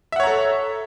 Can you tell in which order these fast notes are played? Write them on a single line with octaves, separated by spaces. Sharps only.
E5 F#5 C#5 A#5 A4